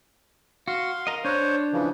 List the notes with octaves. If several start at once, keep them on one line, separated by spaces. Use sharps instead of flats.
F#4 F5 C6
A#4 D#5
D4 C5 C#5 F#6
C#3 E3 F3